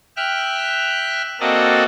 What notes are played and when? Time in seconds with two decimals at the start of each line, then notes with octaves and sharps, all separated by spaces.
0.17 E5 G5 F6 F#6
1.40 A#3 C4 F#4 A4 D5 D#5